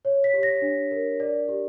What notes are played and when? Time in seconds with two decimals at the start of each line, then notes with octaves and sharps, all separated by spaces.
0.05 C#5
0.24 B6
0.34 G4
0.43 A#6
0.62 D4
0.91 A#4
1.20 D5
1.49 G4